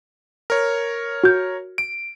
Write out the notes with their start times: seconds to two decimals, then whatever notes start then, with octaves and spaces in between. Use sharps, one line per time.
0.50 A#4 C#5
1.24 F#4 G6
1.78 D7